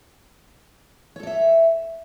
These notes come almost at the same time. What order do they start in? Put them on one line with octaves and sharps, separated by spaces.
C#5 A4 D5 E5